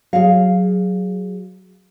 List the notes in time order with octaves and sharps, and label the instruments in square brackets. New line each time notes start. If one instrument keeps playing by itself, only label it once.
[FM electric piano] F#3 [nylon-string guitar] G#4 F5